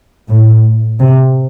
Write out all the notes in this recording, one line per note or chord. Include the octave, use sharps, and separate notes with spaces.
A2
C3